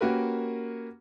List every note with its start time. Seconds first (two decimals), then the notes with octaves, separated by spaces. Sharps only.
0.01 A#3 C#4 F#4 G4 A#4 B4